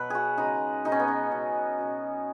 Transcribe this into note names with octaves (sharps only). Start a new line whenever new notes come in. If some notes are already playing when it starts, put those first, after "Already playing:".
Already playing: B2 F#3 B4
F#4 G#4
C#3 G#3 D#4
B2 G#3 D#4
C#4
B3
C#4
C#3 F#3
B2 F#3